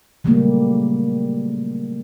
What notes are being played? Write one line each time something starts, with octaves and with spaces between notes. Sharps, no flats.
C#3 F#3 G3 A3 A#3